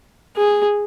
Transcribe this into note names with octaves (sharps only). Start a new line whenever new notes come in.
G#4